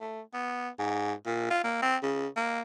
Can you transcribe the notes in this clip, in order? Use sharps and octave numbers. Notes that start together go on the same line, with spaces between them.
A3
B3
G#2
A#2
F4
A#3
C4
C#3
A#3